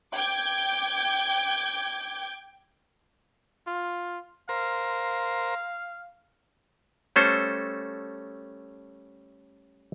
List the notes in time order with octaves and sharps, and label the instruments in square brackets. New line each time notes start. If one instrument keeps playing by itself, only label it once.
[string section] G5 D6 G6 G#6
[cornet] F4
[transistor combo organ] A#4 C5 [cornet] F5
[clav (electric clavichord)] G3 A3 C#4 A4 C5